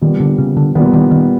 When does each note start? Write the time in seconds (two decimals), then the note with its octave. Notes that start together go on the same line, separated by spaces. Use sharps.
0.01 A#2 D#3 G3 B3
0.20 D3
0.38 C#3
0.57 D3
0.75 A#2 D#3 G3 B3
0.94 D#3
1.11 D#3